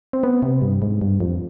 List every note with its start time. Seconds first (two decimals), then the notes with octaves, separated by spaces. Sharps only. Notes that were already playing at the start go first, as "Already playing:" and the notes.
0.13 C4
0.23 B3
0.42 C3
0.62 G2
0.82 G#2
1.01 G2
1.20 F2